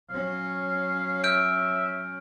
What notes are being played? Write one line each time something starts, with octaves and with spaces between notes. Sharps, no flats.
F#3 C#4 F5
E5 F6 G6 D7